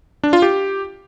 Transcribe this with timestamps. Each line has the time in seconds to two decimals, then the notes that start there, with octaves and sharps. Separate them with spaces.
0.24 D4
0.33 F4
0.42 G4